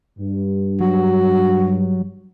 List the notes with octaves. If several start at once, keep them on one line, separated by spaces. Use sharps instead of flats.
G2
F#3 F#4